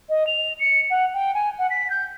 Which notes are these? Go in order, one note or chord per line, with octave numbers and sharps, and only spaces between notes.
D#5
F7
C#7
F#5
G5
G#5
F#5
B6
G6